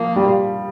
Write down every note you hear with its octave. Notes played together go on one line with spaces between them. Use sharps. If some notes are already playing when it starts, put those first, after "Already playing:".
Already playing: F3 A#3
G3